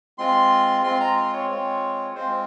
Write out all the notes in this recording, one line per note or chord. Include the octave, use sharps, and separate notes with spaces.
G#3 C4 F4 C6
G#3 C4 F4 C6
A#5
C6
C#5
G#3 C4 F4
G#3 C4 F4 C5